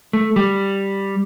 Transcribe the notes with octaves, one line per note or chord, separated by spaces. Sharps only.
A3
G3